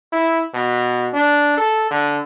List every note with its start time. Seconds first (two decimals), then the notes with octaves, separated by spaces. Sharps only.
0.13 E4
0.54 B2
1.13 D4
1.57 A4
1.91 D3